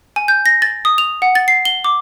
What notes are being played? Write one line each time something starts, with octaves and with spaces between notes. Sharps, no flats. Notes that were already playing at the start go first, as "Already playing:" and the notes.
G#5
G6
A#6
A6
D#6
F7
F#5
A6
C7
G7
D6